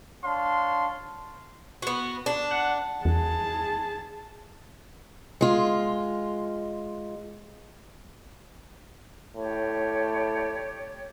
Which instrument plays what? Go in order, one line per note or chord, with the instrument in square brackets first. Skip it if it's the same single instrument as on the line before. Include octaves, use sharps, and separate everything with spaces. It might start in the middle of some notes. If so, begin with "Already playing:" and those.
[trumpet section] D4 C#5 F5 A5 C6
[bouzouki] B3 F#4
D4
[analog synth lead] F#5
[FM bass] E2 [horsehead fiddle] G#4 A5
[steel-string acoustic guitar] G#3 F4
[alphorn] A2 [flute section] G4 C#5 D5